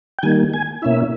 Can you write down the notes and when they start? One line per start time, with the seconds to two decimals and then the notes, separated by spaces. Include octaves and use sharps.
0.19 G5
0.23 D#3 G3 A#3 G#5
0.54 G#5
0.82 B2 A#3 C#4 E4 E5